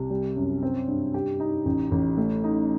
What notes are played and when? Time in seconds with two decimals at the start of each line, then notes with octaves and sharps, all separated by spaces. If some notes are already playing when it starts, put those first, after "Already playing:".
Already playing: C2 C3
0.10 G3
0.36 F#2
0.63 C4
0.88 G2
1.14 G4
1.40 D#4
1.65 A1
1.91 A1
2.17 A3
2.44 D#4